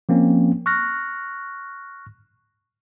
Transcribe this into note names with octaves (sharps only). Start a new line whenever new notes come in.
F3 A#3 C4 C#4
C#6 F6 F#6 A#6